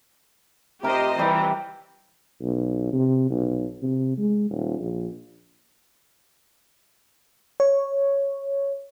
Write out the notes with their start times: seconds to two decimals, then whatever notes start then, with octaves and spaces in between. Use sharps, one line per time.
0.83 C3 G4 A#4 C5 D#5
1.19 E3 G3 G4 A#4
2.41 B1
2.93 C3
3.30 B1
3.82 C3
4.18 G#3
4.50 D#1
4.79 A#1
7.60 C#5